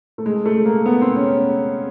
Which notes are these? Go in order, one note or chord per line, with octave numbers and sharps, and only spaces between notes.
A3
G#3
A3
A#3
B3
C4
C#4